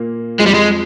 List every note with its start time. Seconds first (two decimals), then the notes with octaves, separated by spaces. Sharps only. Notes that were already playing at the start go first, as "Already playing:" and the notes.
Already playing: A#2 A#3
0.39 F2 F3 G#3
0.46 G3
0.54 G#3